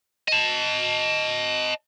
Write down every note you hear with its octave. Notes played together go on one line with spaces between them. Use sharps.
D#5 A5